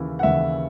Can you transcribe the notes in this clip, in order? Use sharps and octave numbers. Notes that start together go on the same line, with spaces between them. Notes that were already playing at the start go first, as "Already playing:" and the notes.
Already playing: D#2 C#3 E3
F#5
D#2 C#3 E3 E5